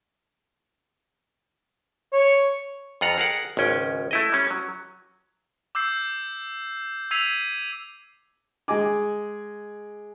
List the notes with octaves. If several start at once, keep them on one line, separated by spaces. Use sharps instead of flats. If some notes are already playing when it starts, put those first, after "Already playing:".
C#5
F2 F4 F#5 A#5
G#4 A#4 F#5
G#1 C#2 C#4 G5
A3 E4 D#5
G3 C#4
F#3
D6 E6 G6 C7
E6 G#6 B6 C7 D#7 F7
G#3 G#4 D#5 G#5 D6